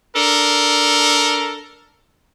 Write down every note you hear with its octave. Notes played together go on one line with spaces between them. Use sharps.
D4 A4 A#4